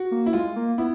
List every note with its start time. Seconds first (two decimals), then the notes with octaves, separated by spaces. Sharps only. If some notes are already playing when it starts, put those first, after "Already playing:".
Already playing: F#4
0.11 A#3
0.26 E4
0.33 G#3 F4
0.56 A#3
0.78 B3 E4